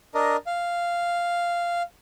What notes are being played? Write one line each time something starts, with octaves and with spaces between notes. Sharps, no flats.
D4 A#4 D#5
F5